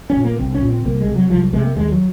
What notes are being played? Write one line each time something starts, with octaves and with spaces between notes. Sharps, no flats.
C#4
A#2
A#3
C2 C4
C#4
A#2
C4
C2 A#3
G#3
C3
F#3
C2 F3
F#3
C3 G#3
A#3
D#2 G#3
F#3